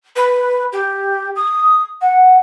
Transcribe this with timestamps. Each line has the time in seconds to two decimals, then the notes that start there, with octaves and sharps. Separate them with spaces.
0.16 B4
0.73 G4
1.36 D#6
2.01 F#5